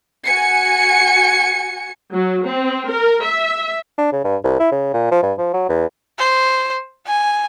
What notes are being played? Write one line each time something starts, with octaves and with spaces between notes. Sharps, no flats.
F#4 G#5 C#7
F#3
C4
A#4
E5
D4
C#3
G2
C2
E4
C#3
A#2
F3
G2
F3
F#3
E2
C5
G#5